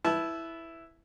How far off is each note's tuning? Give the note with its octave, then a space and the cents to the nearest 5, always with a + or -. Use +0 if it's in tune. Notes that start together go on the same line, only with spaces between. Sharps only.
E4 +0 B4 +0 A5 -25